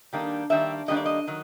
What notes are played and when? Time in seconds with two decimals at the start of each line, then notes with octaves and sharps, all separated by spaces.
0.13 D#3 G3 A#3 D4
0.50 D#3 G3 A#3 D4 E5
0.88 D#3 G3 A#3 D4 D#5
0.97 D5
1.06 D#5
1.27 D#3 F#3